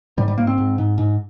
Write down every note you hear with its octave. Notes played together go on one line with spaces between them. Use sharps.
G#2 G3
G3
G#2 A#3
C4
G#2
G#2
G#2